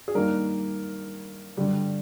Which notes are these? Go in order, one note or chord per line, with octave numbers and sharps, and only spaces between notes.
G#4
G2 D#3 A#3 A#4
G2 D3 G3